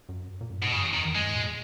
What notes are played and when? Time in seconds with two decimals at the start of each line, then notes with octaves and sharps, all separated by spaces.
0.09 F#2
0.41 A#2
0.50 F#2
0.62 G#2 B2
0.72 F#2 C#3
0.94 E2 D#3
1.14 F#2 G#3
1.26 G#2
1.36 A#2